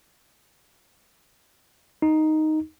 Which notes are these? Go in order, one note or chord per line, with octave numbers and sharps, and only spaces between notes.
D#4